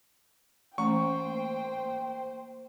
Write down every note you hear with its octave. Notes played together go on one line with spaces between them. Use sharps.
E3 A3 A#3 C#4 C5 G5 C#6